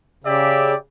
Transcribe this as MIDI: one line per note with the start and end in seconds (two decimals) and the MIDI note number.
0.24 0.74 49
0.24 0.74 67
0.24 0.74 74
0.24 0.74 76